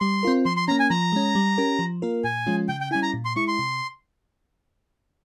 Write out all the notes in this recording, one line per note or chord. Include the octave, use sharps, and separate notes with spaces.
G3 C6
C4 F4 A#4
F3 C6
C6
A#3 C#4 A#5
G#5
F3 A#5
G#3 C#4
G3
C#4 G4 A#4
F3
A#3 F4 A#4
A#2 G#5
F3 G#3 C#4 F4
C#3 G5
G5
G3 C#4 E4 G#5
A#5
A#2
C6
G#3 E4 C#6
C6
C3